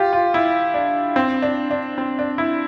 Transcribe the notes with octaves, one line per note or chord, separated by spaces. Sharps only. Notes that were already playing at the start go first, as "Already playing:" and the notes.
Already playing: F4 G4
F4
E4
D4
C4
D4
D4
C4
D4
E4